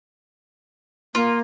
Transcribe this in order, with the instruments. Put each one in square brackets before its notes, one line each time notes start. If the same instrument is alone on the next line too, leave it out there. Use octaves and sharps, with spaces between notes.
[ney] A#3 [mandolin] F4